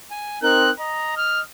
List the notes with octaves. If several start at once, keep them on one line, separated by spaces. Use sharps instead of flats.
G#5
C4 D#4 A#4 F#6
D#5 A#5
F6